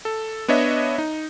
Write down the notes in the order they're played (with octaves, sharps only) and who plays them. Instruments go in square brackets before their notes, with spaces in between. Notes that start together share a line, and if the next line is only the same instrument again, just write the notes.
[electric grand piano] A4
B3 D4 C#5 D#5 E5
D#4